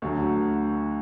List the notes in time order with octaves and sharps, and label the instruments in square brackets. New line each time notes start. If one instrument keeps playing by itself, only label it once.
[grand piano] D2 D3 F#3